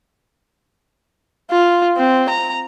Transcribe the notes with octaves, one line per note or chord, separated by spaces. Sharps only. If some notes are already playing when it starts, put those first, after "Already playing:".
F4
C4
A#5